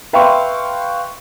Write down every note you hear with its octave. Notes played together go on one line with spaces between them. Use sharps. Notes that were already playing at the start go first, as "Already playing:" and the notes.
B4 E5 F5 G5 C6 C#6